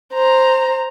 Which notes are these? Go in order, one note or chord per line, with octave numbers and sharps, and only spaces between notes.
C5 A#5